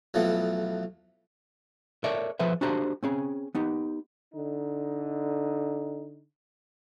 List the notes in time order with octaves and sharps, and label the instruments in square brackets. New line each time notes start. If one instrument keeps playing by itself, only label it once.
[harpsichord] B1 B2 E3 F3 A3
[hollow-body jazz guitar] A4 A#4 C#5 D5 E5
F3 G#4 A4 B4 C5 E5
D4 F#4 G4 A4 C5 A#5
C4 C#4 G#4
B3 D#4 G4
[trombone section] D3 D#4